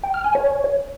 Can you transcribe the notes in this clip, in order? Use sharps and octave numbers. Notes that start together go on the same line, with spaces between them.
G5
F6
G#5
C#5